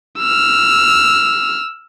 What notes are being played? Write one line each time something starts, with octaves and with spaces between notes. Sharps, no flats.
E6 F6